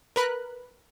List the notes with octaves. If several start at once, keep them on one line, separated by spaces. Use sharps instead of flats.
A#4 B4 B5 F#6